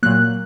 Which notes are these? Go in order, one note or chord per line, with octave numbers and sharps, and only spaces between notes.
A#2 F#3 A#3 F#6